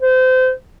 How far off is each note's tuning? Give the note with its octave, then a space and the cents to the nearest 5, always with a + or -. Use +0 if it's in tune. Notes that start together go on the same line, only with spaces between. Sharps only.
C5 -30